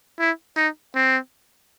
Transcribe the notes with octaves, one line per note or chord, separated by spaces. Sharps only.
E4
D#4
C4